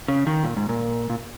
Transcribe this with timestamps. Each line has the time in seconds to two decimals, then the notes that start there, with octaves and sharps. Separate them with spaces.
0.08 C#3
0.27 D#3
0.43 A#2
0.56 G#2
0.69 A#2
1.10 A#2